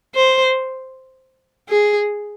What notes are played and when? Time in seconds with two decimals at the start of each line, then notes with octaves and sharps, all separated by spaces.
0.15 C5
1.69 G#4